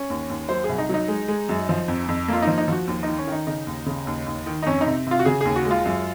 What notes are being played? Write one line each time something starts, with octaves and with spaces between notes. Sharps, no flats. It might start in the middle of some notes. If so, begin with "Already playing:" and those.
Already playing: C#4
D#2
D#2
F#3 C5
C2 G#4
D#4
F#3 D#4
G#3
G#3
F#2
F3
F2
F2
A#3 F4
F3 D#4
D#4
F3 F#4
D#2
D#3 D#4
C#4
D#3 D#4
C#3 D#4
D#2
C#3
D#2
D#2
D#3
D#4
F2 C#4
D#4
C3
C3 F4
F#4
C#3 G#4
D#2 G#4
F#4
G#3 F4
F#2